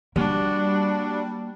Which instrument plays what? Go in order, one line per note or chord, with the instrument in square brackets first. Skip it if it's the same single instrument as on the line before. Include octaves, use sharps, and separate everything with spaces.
[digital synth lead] G3 [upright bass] A#3 [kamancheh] D4 F#4